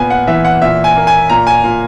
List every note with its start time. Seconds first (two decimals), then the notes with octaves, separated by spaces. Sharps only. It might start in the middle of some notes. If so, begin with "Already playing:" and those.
Already playing: A#2 B3 G#5
0.10 F#5
0.27 E3 E5
0.45 F#5
0.61 A#2 E5
0.84 G#5
0.96 A#3
1.07 G#5
1.29 A#2 A#5
1.47 G#5
1.64 A#2